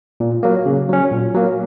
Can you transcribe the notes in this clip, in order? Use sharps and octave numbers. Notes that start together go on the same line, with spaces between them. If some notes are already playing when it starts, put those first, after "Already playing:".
A#2
F#3 A#3
C#3
F#3 C#4
A#2
F#3 A#3